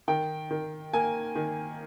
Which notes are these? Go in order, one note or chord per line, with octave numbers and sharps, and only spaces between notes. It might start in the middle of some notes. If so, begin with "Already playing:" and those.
D#3 G5
D#3
A#3 G#5
D#3